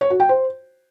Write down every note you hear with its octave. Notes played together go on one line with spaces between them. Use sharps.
C#5
F#4
G5
C5